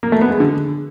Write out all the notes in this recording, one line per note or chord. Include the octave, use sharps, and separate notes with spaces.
A#3
A3
B3
G#3
D3